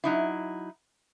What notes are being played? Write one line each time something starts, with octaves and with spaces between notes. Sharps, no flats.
F#3 D#4 E4